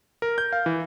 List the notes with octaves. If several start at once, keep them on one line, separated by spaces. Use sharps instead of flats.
A#4
G6
F5
E3